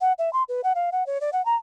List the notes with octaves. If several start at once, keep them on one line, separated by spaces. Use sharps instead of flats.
F#5
E5
C6
B4
F#5
F5
F#5
C#5
D5
F#5
A#5